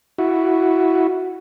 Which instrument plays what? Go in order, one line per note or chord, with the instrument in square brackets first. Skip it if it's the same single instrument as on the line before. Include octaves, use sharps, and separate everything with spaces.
[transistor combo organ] E4 F#4